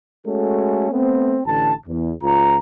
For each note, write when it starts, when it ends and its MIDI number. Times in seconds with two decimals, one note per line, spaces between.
0.25 0.88 56
0.25 0.88 57
0.25 0.88 61
0.25 0.88 66
0.25 0.88 69
0.91 1.39 57
0.91 1.39 59
0.91 1.39 60
1.45 1.72 33
1.45 1.72 50
1.45 1.72 81
1.86 2.10 40
2.22 2.56 37
2.22 2.56 65
2.22 2.56 82